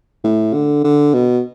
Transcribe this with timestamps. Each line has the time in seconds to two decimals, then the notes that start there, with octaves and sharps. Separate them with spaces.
0.24 A2
0.54 D3
0.84 D3
1.14 B2